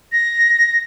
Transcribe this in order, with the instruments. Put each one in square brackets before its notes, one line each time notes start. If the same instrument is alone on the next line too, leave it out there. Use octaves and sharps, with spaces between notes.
[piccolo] A#6